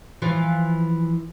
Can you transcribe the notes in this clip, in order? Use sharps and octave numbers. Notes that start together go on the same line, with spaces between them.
E3 F3 F4